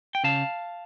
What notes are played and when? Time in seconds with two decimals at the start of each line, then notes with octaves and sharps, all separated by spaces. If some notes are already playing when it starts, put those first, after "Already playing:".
0.15 G5
0.24 C#3 F5 A5